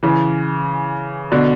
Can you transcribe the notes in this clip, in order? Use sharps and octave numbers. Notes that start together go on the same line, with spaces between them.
C#3 E3
B2 D3